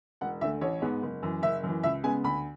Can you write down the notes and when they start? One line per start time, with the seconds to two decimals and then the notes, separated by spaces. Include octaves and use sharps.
0.21 E1 F#5
0.41 D2 D3 A3 E5
0.61 A1 C#5
0.82 G#2 G#3 B3
1.02 F#1
1.23 F#2 E3
1.42 F#1 E5
1.63 F#2 E3
1.83 C#2 E5
2.03 C#3 G#3 B3 G#5
2.24 D2 B5